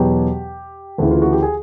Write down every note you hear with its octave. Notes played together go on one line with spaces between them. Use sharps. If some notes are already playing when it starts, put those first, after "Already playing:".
Already playing: E2 B2 F#3 G4
D2 C#3 E3
F4
F#4
G4
G#4